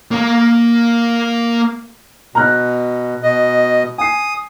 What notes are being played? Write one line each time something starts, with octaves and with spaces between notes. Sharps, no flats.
A#3 A#4
B2 A#5 F6 F#6
B2 D#5
G#5 D#6 C7